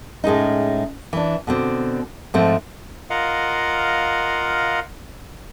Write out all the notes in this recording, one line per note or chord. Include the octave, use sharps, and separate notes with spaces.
A2 G#3 C#4 D#4
E3 D4
B2 D3 C4
G#2 F3 A3 C4
F4 A#4 D#5 F5 F#5